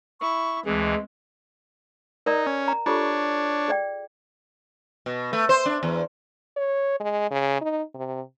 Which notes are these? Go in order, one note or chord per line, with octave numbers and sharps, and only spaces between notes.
E4 C#6
D2 E3 G#3 C4 G#4
D#4 A#4 D5 A#5
C#4
A#5
D4 F4 G4 A4 C#5
G#4 D5 G5
B2
A3
C5
D4
E2
C#5
G#3
C#3
D#4
C3